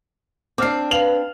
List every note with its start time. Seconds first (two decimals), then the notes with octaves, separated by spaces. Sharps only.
0.58 C4 D4 D6 F6 C7
0.91 B4 F5 F7 F#7